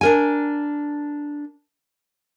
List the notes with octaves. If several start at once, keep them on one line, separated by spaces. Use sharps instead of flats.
D4 A#4 G#5